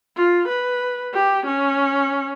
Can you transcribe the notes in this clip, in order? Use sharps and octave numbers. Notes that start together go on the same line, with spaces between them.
F4
B4
G4
C#4